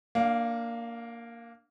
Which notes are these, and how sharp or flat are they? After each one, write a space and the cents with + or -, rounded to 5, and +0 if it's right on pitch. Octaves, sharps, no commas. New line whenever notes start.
A#3 -5 D4 +5 F5 +45